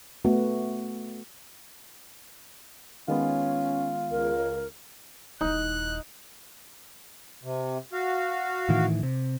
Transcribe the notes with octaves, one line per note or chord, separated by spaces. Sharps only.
A3 B3 F#4
D#3 G#3 B3 C#4 F4
C#2 A#4
D#1 D#4 E4 F#6
C3
F#4 F5
A2 D#3 E3
C3